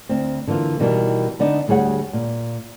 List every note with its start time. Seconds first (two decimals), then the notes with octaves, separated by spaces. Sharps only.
0.09 D2 C4
0.47 D3 E3 A#3 F4
0.80 B2 D#3 E3 G3
1.39 D3 B3 D4 D#4
1.68 D2 G3 G#4 C#5 F#5
2.13 A#2